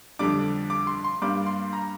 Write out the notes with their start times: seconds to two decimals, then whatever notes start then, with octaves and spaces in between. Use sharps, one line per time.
0.19 F2 D3 G3 D4 D6
0.70 D6
0.87 C6
1.04 C6
1.22 G2 G3 A#3 D4 D6
1.47 C6
1.73 A#5